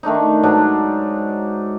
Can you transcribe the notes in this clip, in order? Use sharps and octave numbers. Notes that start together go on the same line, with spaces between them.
D#3 A3 D4 D#4
G#2 F#3 D4 D#4